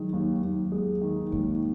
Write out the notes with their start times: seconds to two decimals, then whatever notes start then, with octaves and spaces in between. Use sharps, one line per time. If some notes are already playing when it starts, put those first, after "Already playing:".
Already playing: D#3 F#3 G#3
0.13 D#2
0.42 D#2
0.72 G#3
1.02 D#3
1.31 D#2 G#3